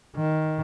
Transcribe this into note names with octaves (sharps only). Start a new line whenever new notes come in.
D#3